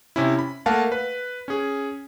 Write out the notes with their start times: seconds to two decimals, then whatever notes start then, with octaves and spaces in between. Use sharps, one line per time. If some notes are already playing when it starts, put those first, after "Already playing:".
0.16 C3 C#4 E4
0.39 B5
0.66 A3 A#3 A#4 F5 F#5 A5
0.92 B4
1.48 C#4 G#4